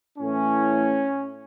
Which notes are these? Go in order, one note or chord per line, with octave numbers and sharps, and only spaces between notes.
A2 E3 A3 C#4